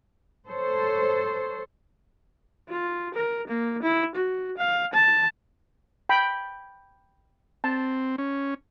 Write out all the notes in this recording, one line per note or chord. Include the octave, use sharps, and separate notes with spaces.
A4 C5 C#5
F4
A#4
A#3
E4
F#4
F5
A5
G5 B5
C4 A5
C#4